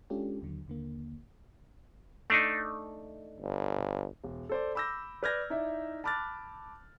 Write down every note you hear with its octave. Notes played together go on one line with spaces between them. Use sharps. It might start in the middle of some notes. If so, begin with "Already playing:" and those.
G#3 C#4 D4 F4 G4 A4
D#2 D3 F#3
D#2 D3 A#3
A3 D4 D#4
G1
E1
A4 C5 D5
B5 D6 E6 G6 A#6
B4 D5 F6 G6 G#6 A#6
D#4 E4 D5 E5
A5 B5 D6 F6 F#6 A6